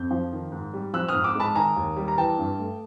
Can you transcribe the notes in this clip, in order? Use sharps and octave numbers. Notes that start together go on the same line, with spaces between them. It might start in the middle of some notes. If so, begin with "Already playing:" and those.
Already playing: F2 G6
F3
D#3
G#2
G3
F3 E6 F#6
D#6 F6
G#2
D6 E6
G#3 A5 B5
D#3 G#5 A#5
D#2
G3
A#5
E3 G5 A5
G2
A3